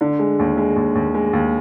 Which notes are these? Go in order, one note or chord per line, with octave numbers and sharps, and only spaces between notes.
D3
G#3
D#2
G#3
D#2
D#2
G#3
D#2